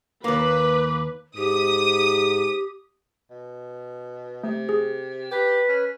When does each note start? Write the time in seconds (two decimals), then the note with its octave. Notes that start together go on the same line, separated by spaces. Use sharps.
0.24 D#2 A#3 B4 D6
1.37 G#2 G4 D#6
3.30 B2
4.44 C3 A3
4.69 G#4
5.31 G4 B4
5.68 C#4